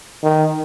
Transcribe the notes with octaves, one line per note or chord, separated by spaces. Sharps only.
D#3